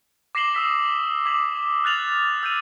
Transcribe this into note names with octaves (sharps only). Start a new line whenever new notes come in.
D6 A#6 C7 E7 F#7 G7
D#6 E6 B6 E7
E7
D6 D#6 G#6 B6 F#7
F6 F#6 A6 F7 F#7
E6 G6 A6 D#7 F7